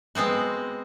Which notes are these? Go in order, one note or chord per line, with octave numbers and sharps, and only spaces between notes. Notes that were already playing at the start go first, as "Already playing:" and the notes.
G#3 B3 C4 F#4